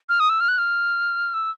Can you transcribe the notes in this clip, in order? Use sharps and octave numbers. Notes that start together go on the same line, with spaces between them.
F6
D#6
E6
F6
F#6
F6
E6